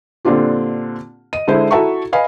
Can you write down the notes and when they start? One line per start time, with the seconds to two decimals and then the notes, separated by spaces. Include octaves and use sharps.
0.25 A#2 D3 C4 D4 F4 G4
1.33 D#5 D#7
1.48 D3 G#3 E4 C5
1.71 E4 F#4 A4 E5 A#5 C#6
2.12 B4 D#5 F5 G#5 B5